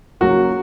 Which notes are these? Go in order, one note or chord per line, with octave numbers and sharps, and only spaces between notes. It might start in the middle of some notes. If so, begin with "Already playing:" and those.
C#3 F#3 A#3 F#4